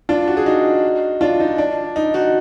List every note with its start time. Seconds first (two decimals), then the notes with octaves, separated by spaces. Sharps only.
0.09 D4 F4
0.27 F#4
0.37 G#4
0.46 D#4 F#4
1.21 D4 F4
1.40 D#4
1.58 D4
1.96 D#4
2.14 D#4 F#4